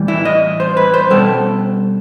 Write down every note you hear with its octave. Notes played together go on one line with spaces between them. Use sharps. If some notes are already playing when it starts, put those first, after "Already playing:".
Already playing: A2 E3 G3
E4
D#5
C5
B4
C5
B2 G3 A4